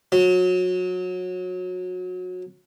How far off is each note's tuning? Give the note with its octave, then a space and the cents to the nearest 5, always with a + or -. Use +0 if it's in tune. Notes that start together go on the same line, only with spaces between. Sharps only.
F#3 -25